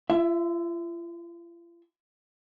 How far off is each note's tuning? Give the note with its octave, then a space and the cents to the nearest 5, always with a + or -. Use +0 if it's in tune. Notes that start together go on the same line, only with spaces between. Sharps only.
F4 -40 E5 +10